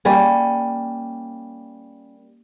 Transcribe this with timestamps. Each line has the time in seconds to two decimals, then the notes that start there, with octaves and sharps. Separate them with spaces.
0.05 G3 A#3 C#4